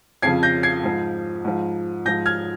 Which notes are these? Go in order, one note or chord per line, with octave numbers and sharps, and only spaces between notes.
F2 C#3 F3 G#6 C7
G6 A#6
G#6 C7
G#2 F3
G#2 F3
G#2 F3 G6 A#6
F6 G#6